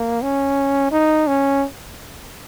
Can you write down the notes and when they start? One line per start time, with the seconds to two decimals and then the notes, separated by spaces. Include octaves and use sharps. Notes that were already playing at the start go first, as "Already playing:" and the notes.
Already playing: A#3
0.22 C#4
0.92 D#4
1.27 C#4